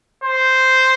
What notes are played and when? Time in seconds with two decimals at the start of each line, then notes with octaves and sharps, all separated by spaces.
0.24 C5